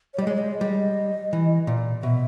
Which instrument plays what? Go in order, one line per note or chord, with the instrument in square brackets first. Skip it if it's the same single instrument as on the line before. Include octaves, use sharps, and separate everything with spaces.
[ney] C#5
[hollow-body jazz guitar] G3
[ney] D#5
[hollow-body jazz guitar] G#3 [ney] C#5
[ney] D#5
[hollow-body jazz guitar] G3 [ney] D#5
[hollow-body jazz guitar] E3
A#2
[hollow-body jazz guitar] B2 [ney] E5